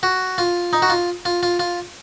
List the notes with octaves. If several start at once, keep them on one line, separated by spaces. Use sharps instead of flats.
F#4
F4
D#4
F#4
F4
F4
F4
F4